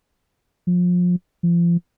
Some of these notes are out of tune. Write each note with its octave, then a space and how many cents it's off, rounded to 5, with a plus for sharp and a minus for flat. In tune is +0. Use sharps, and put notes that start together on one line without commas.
F3 +30
F3 -30